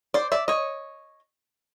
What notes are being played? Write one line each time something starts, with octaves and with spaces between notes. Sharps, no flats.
C5 D5
D5 E5
C#5 D#5